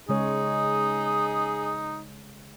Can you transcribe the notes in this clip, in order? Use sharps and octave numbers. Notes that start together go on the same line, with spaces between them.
C#3 G#3 D#4 G#4 C#5